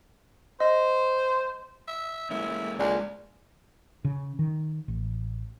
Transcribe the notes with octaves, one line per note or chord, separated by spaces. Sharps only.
C5 D#5
E5
G#3 A#3 C#4 E4
C#2 D4 D5
C#3
D#3
A1